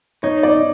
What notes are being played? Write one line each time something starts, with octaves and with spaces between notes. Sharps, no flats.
D#4 C#5
D5